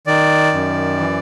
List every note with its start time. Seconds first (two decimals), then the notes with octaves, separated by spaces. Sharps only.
0.07 D#3 D5
0.53 F#2
0.98 E3